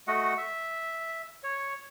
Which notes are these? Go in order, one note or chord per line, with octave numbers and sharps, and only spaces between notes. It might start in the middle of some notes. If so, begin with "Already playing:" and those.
A3 F#4 D#5 F#5
E5
C#5